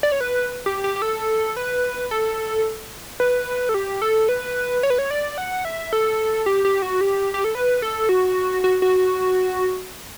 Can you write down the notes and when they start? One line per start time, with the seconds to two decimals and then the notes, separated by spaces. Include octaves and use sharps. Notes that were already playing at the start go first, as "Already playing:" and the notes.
0.03 D5
0.12 C#5
0.20 B4
0.66 G4
0.84 G4
0.96 G4
1.02 A4
1.57 B4
2.11 A4
3.20 B4
3.69 A4
3.74 G4
4.02 A4
4.29 B4
4.83 C#5
4.90 B4
4.98 C#5
5.11 D5
5.38 F#5
5.65 E5
5.93 A4
6.46 G4
6.65 G4
6.82 F#4
7.01 G4
7.34 G4
7.44 A4
7.55 B4
7.82 A4
8.09 F#4
8.64 F#4
8.82 F#4